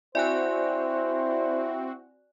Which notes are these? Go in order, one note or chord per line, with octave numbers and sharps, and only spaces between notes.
C4 E4 F#4 C5 D5 G#5 F#6